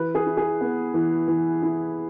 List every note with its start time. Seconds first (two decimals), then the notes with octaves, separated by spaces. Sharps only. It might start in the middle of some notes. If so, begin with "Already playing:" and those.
Already playing: E3 B4
0.15 G#4
0.26 E4
0.37 G#4
0.61 B3
0.94 E3
1.28 E3
1.62 E4